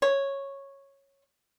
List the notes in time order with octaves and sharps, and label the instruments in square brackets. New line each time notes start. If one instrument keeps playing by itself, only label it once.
[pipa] C#5